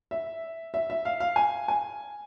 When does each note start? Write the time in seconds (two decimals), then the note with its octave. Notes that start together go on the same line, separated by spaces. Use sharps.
0.11 E5
0.74 E5
0.90 E5
1.05 F5
1.20 F5
1.36 G#5
1.68 G#5